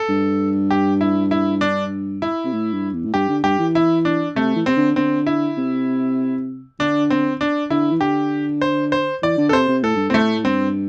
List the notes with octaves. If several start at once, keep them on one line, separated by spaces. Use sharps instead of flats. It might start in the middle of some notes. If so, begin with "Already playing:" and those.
Already playing: A4
G2
G4
E4
E4
D4
E4
C3
A2
G2
E2
A2
G2 G4
D3
G2 G4
E3
E4
D4
C3 A3
E3
C3 C4
D3
D3 C4
E4
C3
D3 D4
C4
D4
D3 E4
E3
D3 G4
C5
C5
E3 D5
D3
A4
C3 C5
C3
A2 A4
G2
A2 A3 C4
G2 C4